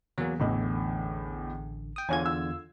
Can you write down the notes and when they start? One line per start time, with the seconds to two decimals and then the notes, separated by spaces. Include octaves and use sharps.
0.18 E2 F#3 A#3
0.40 A1 E2 A2 D3 D#5
1.96 G5 D#6
2.09 E2 D3 F4 C#5 G#5 G#6
2.24 F4 E6